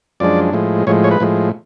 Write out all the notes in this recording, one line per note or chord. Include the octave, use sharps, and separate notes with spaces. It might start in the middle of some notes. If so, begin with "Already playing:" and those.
F#2 F3 G#3 D4 D5
A2 F3 G#3
A2 F3 G#3 C#5
C#5
B4
A2 F3 G#3